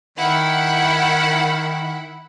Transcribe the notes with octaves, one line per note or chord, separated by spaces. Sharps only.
D#3 E4 F#5 B5